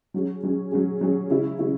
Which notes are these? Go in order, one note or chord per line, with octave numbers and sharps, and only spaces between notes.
F#3 C#4 G#4
F#3 C#4 G#4
F#3 C#4 G#4
F#3 C#4 G#4
C#3 G#3 C#4 E4
C#3 G#3 C#4 E4